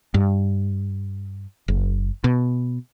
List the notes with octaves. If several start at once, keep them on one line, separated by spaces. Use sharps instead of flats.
G2
F#1
B2